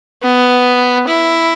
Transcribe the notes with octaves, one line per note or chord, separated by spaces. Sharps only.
B3
E4